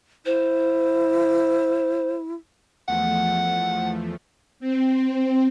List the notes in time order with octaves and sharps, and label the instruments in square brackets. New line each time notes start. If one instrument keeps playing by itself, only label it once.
[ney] E4 [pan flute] C5
[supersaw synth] E2 F3 A3 [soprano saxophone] F#5
[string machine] C4